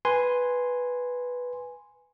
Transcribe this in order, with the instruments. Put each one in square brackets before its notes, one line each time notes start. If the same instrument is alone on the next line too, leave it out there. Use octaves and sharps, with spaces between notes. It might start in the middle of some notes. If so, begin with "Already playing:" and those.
[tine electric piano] B4 G#5 C6